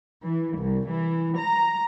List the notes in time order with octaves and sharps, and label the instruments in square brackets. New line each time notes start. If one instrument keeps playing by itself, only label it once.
[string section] E3
C2
E3
A#5